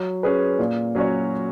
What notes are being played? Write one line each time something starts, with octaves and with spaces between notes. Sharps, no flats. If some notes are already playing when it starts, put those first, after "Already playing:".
Already playing: F#3
C#4 G#4 B4
A#2
F#3 C#4 F#4 C#5